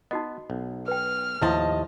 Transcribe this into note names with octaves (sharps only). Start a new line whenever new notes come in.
B3 D#4 F#4 D#5
B1
B4 G5 F6
D#2 A2 F3 E4 D#5 A5